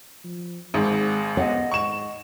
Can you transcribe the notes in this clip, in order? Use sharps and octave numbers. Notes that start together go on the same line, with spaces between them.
F3
G#1 G#2 G#3
B3 D#5 F#5
G#2 C#6 E7